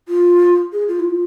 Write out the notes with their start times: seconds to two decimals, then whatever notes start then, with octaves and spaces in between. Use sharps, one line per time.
0.09 F4
0.73 G#4
0.88 F4
1.00 E4
1.04 F4